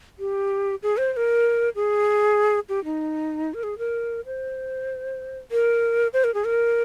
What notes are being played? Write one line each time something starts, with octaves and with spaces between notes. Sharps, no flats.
G4
G#4
C5
C5
A#4
G#4
G4
D#4
A#4
G#4
A#4
C5
A#4
C5
A#4
G#4
A#4